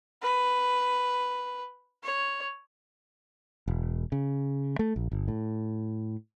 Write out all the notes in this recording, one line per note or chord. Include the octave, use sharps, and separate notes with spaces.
B4
C#5
E1
C#3
A3
A#1
G1
A2